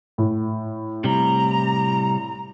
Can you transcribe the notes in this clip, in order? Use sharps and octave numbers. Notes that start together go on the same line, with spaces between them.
A2
C3 G3 A#5